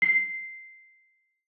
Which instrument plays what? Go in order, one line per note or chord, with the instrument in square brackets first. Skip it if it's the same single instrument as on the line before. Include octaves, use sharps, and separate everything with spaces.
[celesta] C7